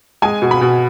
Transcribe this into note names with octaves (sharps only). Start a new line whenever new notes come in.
G#3 G#5
B2
B5
B2